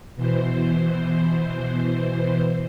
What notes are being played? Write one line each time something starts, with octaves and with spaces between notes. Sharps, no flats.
B2 E3 C5